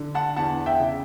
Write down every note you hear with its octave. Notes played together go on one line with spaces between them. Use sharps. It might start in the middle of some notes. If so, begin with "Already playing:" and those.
Already playing: D3
F#5 A5
E2 F#5 A5
E5 G5
C#3